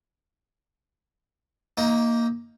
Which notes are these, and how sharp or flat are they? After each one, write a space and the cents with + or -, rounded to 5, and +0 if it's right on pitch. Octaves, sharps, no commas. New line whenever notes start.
A#3 +0 D#4 +20